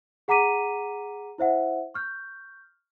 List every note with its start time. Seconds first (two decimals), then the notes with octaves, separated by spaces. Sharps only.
0.28 G#4 F#5 A#5 D6 B6 D#7
1.38 E4 C5 E5 F#5
1.94 C#6 F6 G6